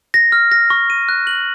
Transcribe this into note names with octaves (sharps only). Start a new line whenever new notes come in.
A#6
F6
A#6
C#6
D#7
F#6
F#7